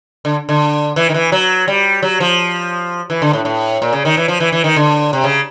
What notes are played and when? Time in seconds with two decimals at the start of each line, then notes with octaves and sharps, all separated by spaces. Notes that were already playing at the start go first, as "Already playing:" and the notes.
0.25 D3
0.49 D3
0.96 E3
1.09 D#3
1.14 E3
1.32 F#3
1.68 G3
2.02 F#3
2.20 F3
3.10 E3
3.22 D3
3.33 A2
3.45 A2
3.82 A#2
3.93 C#3
4.05 D#3
4.17 E3
4.28 F3
4.40 E3
4.52 E3
4.64 D#3
4.76 D3
5.13 C3
5.24 C#3